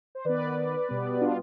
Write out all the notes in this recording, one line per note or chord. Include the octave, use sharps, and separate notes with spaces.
C5
D#3 B3 B4 D5
B2 G3 B3
D4 F4